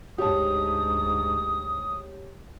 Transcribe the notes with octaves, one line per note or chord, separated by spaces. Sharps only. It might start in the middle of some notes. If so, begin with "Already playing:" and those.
D2 G#2 G4 C#5 A5 D#6